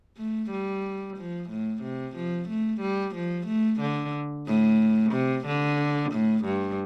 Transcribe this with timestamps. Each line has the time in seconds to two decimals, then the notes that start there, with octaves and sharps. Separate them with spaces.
0.17 A3
0.51 G3
1.17 F3
1.50 A2
1.82 C3
2.16 F3
2.49 A3
2.81 G3
3.15 F3
3.47 A3
3.81 D3
4.46 A2
5.12 C3
5.46 D3
6.12 A2
6.45 G2